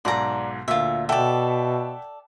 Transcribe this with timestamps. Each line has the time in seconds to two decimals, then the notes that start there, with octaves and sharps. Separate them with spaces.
0.05 B1 G#2 D5 A#5
0.68 D2 A#2 F4 E5
1.09 B2 A4 D5 E5 F#5 G5